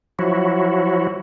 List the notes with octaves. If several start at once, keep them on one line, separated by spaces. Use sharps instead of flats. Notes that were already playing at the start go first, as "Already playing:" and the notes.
F3 F#3 E4 F#4